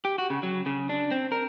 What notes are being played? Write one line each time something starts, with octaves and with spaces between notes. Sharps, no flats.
G4
F#4
C#3
F#3
C#3
D4
C4
A#4